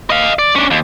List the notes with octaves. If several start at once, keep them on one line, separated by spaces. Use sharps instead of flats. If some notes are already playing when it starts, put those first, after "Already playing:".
D#5 F5
D5
C#4 D4
D#2